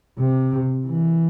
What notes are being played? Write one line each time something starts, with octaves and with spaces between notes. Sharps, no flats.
C3
E3